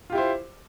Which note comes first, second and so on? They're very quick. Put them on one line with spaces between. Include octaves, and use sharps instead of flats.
F4 G4 E4 C5